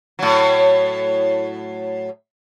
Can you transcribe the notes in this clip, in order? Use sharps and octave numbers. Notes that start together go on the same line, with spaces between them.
A2 F#3